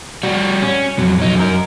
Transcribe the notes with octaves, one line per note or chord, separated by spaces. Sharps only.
G3 F#4
C#4
F2 F#3
F#3 D#4
F#2 A#4